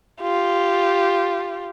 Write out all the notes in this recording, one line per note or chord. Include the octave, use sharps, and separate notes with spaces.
F4 G4